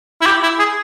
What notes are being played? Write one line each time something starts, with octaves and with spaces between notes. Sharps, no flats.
E4
G4
E4
G#4